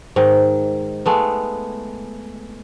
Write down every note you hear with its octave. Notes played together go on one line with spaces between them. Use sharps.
G#2 D#3
G#3 A3 B3